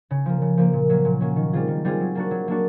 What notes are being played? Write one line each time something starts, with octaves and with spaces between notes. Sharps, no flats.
C#3
F3 A#3
C#3
F3 A#3
A#2
F#3 A#3 C#4
A#2
F#3 A#3 C#4
D#3
G3 C4 F4 G#4
D#3
G3 C4 F4 G#4
F#3
A#3 D4 F#4
F#3
A#3 D4 F#4